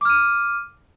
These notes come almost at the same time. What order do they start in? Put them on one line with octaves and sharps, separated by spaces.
D6 F6 D#7